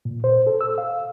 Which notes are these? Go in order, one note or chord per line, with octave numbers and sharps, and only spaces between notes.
A#2
C5
A4
E6
F5